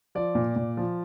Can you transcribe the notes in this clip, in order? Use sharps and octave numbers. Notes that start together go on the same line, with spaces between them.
F3 D5
A#2
A#2
F3